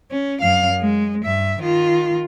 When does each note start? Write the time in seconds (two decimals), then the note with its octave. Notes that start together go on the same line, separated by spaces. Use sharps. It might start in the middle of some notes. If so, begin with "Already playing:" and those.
0.11 C#4
0.41 F#2 F5
0.81 G#3
1.25 G2 E5
1.60 D#3 F4